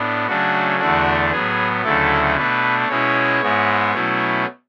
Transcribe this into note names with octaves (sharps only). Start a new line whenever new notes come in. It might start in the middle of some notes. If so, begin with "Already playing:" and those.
Already playing: A2 B3 D4
C#3 F#3 A3 D4 F#4
E2 D3 A3 D4 F#4
A2 F#3 B3 G#4
D2 C#3 F#3 A3 E4 A4
B2 A3 D4 B4
B2 G#3 C#4 E4 C#5
G#2 G#3 B3 E4
B2 F#3 A3 C#4 E4